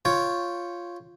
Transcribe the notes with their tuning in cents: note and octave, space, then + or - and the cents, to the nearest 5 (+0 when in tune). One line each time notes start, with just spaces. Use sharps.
F4 +0 C#5 +0 G5 +0